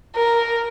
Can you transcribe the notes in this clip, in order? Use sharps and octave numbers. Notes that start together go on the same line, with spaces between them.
A#4